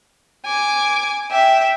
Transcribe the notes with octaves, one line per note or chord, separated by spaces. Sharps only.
G#5 D6
E5 G5